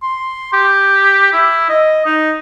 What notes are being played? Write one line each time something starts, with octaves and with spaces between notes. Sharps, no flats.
C6
G4
E4
D#5
D#4